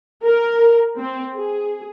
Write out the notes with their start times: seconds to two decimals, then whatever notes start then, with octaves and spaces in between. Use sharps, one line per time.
0.23 A#4
0.99 C4
1.37 G#4